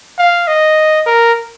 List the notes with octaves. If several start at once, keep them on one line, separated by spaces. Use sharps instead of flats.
F5
D#5
A#4